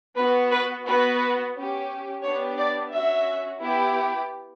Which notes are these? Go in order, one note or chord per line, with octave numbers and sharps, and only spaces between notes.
B3 F#4 B4
B4
B3 F#4 B4
C#4 G4
B3 D4 G4 C#5
D5
C#4 F#4 E5
B3 E4 G4